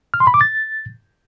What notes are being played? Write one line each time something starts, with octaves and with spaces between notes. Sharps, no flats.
F6
C6
B5
D6
A6